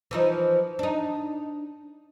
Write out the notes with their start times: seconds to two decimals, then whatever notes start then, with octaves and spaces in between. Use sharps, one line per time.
0.11 E3 F3 D#4
0.79 D4 D#4